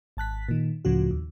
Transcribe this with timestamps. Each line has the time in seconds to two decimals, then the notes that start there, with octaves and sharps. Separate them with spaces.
0.17 G#1 A5 F#6 B6
0.49 A#2 D#3
0.85 C#2 A2 C#3 F3 F#4
1.11 D#2